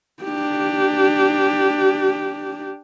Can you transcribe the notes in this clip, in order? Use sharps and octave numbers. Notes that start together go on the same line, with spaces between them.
D4 G4